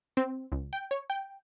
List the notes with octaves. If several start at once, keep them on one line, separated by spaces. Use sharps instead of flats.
C4
C#2
G5
C#5
G5